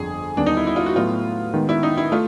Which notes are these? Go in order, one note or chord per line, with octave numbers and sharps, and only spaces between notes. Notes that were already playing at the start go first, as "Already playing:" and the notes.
Already playing: G1 F2 D3 G#4
D#2 D3 G3 B3 D4
D#4
E4
E4
F4
F#4
A2 F#3 B3 F4
D#3 G#3 B3
E4
D#4
E4
A3 F4